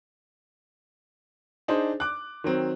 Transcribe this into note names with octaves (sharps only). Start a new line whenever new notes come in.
D4 D#4 G#4 C5
D6 F#6
D#3 F#3 C4